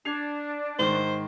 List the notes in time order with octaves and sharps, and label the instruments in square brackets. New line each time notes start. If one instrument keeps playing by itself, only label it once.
[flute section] D4 [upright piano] G#6 C7 F7
[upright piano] G#2 D#3 [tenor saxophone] C5